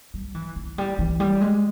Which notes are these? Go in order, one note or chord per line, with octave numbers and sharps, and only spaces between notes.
G3
E3
E3
G3
E3
G3
G#3